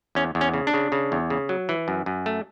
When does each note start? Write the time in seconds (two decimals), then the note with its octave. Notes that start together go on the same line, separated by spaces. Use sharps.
0.15 E2 C#4
0.35 E2
0.41 C#4
0.54 C#3
0.67 D4
0.74 C#3
0.92 C#3
1.12 E2
1.30 C#3
1.49 F#3
1.69 E3
1.88 F#2
2.06 F#2
2.26 A3